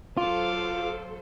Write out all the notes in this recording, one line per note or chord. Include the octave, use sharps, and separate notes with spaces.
F#3 F4 A4 C5 F5 D6